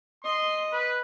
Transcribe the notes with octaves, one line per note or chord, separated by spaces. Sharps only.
D#5 C6
B4